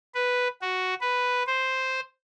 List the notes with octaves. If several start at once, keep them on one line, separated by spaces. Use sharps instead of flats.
B4
F#4
B4
C5